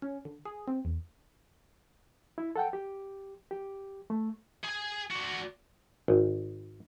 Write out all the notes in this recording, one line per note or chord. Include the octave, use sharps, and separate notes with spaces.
C#4
D3
G#4
C4
E2
E4
A4 F#5 G5
G4
G4
A3
G#4 G#5
D4 F#4
G#1